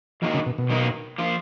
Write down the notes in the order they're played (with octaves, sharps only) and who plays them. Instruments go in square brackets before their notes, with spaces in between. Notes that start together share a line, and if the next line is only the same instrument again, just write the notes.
[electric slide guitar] G#2 D#3 A#3 D#4 F#4 [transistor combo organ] F3
[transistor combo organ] C#3
B2
B2
[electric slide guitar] D#3 F#3 A#3 D#4
F3 A#3 F4